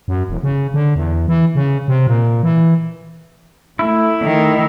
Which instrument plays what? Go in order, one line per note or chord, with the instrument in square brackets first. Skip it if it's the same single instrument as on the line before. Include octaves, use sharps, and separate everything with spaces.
[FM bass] F#2
E1
C#3
D3
E2
E3
C#3
C3
A#2
E3
[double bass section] A3 [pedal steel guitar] E4
[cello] D#3